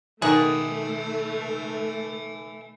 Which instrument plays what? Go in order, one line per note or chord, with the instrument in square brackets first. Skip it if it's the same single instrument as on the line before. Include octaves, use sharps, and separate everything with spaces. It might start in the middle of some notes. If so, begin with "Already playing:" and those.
[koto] B2 D#3 F#5 [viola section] A3 [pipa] G#4 [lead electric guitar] E5 G#5